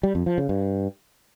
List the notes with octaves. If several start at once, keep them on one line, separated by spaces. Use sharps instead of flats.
G3
F2
F3
C#3
G2